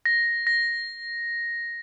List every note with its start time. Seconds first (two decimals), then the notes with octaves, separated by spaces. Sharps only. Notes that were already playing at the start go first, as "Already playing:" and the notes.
0.06 A#6
0.47 A#6